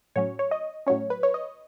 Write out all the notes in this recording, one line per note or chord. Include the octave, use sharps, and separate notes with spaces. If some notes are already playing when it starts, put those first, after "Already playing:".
A2 F#3 C#4 C#5
C#5
D#5
A2 F#3 C#4 C#5
B4
C#5
D#5